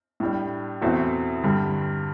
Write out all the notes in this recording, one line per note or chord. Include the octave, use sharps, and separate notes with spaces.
A2 G3 D4
E2 B2 A3 C4 F#4
G2 D3 G3